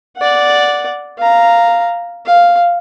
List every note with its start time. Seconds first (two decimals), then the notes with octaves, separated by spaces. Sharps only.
0.17 D5 F#5
1.18 F5 A#5
2.26 F5